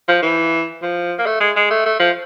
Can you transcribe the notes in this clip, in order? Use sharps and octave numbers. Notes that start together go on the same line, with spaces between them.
F3
E3
F3
A#3
A3
G#3
G#3
A3
A3
F3